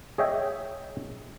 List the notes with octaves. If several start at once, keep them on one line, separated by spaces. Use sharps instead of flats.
G#4 C#5 D#5 E5 G5